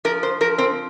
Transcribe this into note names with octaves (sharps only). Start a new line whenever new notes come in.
F3 A#4
C5
F3 A#4
C4